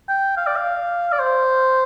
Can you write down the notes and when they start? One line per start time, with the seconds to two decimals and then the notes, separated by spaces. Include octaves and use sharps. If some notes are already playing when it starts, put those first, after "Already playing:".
0.09 G5
0.37 F5
0.47 D5
0.56 F5
1.13 D5
1.20 C5